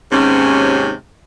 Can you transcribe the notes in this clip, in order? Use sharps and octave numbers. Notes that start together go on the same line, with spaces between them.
D#2 G#2 C3 C#4